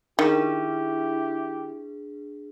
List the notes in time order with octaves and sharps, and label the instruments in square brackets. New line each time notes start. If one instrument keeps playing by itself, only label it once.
[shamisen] D#3 [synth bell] D4 G#4 [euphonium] E4 [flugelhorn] G4